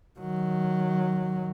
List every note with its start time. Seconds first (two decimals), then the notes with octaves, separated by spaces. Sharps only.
0.19 D#3 F#3